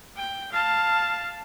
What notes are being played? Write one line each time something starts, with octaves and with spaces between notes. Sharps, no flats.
G5
F5 A5